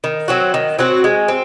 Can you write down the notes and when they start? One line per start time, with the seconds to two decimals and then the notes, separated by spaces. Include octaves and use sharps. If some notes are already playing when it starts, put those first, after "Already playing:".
0.04 D#3
0.28 F#3 C4 F#4
0.54 D#3
0.79 F#3 C4 F#4
1.04 G#3
1.28 C4